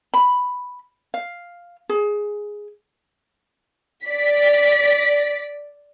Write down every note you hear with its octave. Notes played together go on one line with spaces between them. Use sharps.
B5
F5
G#4
D5 B6